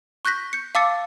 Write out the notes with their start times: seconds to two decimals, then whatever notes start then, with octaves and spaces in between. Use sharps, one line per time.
0.25 C#6 F#6 G6 A#6 B6
0.53 G6 C#7
0.75 F5 A5 D6 E6 A6 C#7